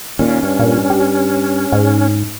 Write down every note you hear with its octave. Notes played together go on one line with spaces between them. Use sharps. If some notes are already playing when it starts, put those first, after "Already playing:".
D#2 A#2 C#4
G2
A#2
G4
G#2